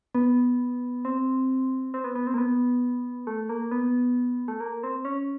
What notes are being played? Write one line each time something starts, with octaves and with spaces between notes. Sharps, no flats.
B3
C4
C4
B3
B3
C4
A#3
B3
A3
A#3
B3
A3
A#3
C4
C#4